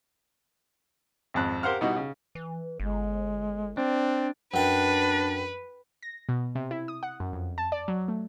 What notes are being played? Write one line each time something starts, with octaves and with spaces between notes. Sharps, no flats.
G#1 F2 F#6
G4 A#4 C5 F5 F#5 F6
B2 G3 D#4 E4 F#4
C#3
E3
G1 G#3
C4 D4
F#2 D4 B4 G5
A#6
B2
C3
E4
D#6
F#5
F#2
F2
A5
D5
F#3
A3